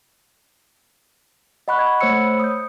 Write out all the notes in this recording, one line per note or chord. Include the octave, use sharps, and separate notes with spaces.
D#5 F#5 B5 C#6 F#6
G#6
A3 C5 C#5 B5 E6 C#7
D#6 G6